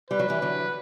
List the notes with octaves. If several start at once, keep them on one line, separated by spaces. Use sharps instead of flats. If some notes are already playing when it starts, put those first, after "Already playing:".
G3 B4
F#3
E3 G3
D3 F#3